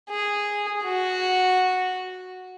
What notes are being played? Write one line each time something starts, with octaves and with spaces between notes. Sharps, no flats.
G#4
F#4